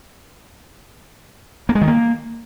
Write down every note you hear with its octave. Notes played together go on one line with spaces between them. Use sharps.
A#3
G#3
D#3
A#3